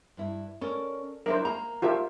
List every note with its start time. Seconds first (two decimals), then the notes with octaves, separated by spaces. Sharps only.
0.17 G2 E4
0.61 C#4 A4 A#4 D5
1.26 F#3 D4 E4 A#4 C5 E5
1.45 A#3 A#5
1.82 F4 G4 A#4 C5 E5